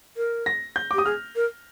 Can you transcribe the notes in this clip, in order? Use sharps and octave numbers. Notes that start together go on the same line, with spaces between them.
A#4
A#6
G6
D6
G4 D#6
G#4 F6
A#4